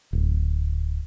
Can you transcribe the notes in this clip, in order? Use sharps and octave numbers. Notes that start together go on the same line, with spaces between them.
D1